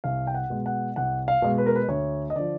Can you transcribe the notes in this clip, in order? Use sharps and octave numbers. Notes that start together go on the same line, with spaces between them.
C2 F5
G5
F#5
B2 G#3
F#5
C2 F#5
F5
B2 G#3
B4
A#4
B4
D2 C#5
D#5
D3 F3 D5